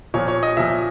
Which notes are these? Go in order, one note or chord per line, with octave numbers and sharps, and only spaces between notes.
A#2 F3 C#5
C#5
D#5
A#2 F3 E5